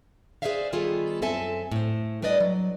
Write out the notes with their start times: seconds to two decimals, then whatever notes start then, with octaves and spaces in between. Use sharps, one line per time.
0.42 G#4 B4 C5 D5 E5 F5
0.73 D#3 G3 B3 F4 G#4 A4
1.22 F#2 C4 A4 E5 G#5 A5
1.72 A2 C5
2.22 G3 D4 B4 D5 D#5
2.40 F#3